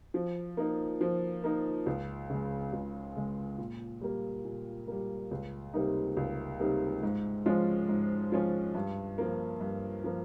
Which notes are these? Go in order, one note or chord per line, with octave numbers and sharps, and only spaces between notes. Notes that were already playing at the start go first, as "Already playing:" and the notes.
F3
A#3 D#4
F3
A#3 D#4
C#2
C#3 G#3
C#2
C#3 G#3
A#2
G3 A#3
A#2
G3 A#3
C#2
C3 G3 A#3 D#4
C#2
C3 G3 A#3 D#4
G#2
F3 G#3 C#4 F4
G#2
F3 G#3 C#4 F4
G2
F3 A#3
G2
F3 A#3